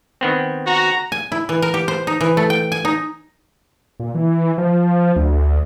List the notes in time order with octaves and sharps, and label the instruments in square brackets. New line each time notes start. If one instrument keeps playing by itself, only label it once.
[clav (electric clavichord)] D#3 B3 C4
[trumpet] F#4 [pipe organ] A#5
[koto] G#5
E4
E3
A#4
G4
C5
D#4
E3
A3
G5
G#5
D#4
[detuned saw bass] A#2
E3
F3
D2